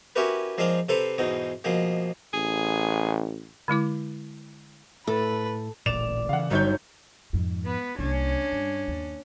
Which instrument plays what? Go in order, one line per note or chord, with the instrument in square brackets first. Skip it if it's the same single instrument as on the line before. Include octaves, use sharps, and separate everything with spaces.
[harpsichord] C#4 E4 F#4 G4 A#4 B4
F3 G#3 C4 D4 A#4 F5
C3 A4 B4 C5 A#5
E2 G#2 B2 D#4
B2 F3 G#3 A#3
[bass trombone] A1 [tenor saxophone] G#4
[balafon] D3 G#3 E4 D6
[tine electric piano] A2 A3 [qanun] A4 [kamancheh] B4
[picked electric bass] D1 A1 A#2 [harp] D5 [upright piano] E7 F7
[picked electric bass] C#3 E3 [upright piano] F5 F#5
[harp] G1 [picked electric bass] G2 [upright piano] F#3 C#5 G6 [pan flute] D#4
[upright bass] F2 G#2
[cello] B3 B4
[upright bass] C2 A#3 [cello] C#4 D4
[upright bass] G2
D#2